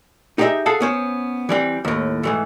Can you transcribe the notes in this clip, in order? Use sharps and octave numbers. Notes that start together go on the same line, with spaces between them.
D#4 G4 G#4 B4 D#5 E5
G#4 A4 F5 F#5 A5
B3 C#4 C5
E3 G3 C4
D#2 A2
G#2 E3 A3